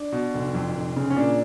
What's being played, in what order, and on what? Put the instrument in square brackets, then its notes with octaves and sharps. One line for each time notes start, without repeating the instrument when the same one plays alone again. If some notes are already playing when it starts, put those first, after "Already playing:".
Already playing: [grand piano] D4
B2
F1
F2
F1
C#3
C#4
A#2 D4